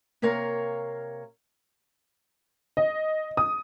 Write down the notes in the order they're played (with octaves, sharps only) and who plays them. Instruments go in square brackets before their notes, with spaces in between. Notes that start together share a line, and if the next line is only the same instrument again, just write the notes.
[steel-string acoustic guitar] C3 A#3 A#4 C#5 F5 A#5
[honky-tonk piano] D#5
D#6